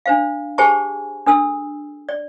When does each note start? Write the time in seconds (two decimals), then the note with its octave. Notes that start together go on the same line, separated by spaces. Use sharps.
0.06 D4 C5 F5
0.58 G4 G#4 C5 G#5 A5 C#6
1.26 D4 A4 E6
2.09 D5